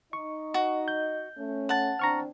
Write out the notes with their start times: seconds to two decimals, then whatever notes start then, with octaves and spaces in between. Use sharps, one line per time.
0.13 D#4 D#5 C#6
0.54 F#4
0.88 G6
1.37 A3 C#4
1.69 F#5 A5
1.99 E2 C4 D4 A#5 C#6 F6